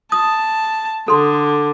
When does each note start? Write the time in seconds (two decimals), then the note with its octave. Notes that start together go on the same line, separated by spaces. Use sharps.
0.12 A5 D#6
1.08 D3 A4 C6